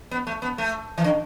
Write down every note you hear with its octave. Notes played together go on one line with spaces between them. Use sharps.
B3
A3
B3
A3
E3
D3